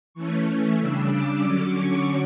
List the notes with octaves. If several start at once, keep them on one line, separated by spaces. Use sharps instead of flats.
E3 A3 C#4 C#6
C#6
C#3 G3 D4 E6
D6
D3 F#3 C#4 D6
C#6